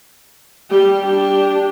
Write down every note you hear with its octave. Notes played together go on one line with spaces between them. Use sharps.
G3 G4
D4 G4